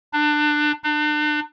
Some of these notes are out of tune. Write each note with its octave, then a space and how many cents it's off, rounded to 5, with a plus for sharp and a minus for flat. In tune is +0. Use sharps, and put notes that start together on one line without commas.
D4 +25
D4 +40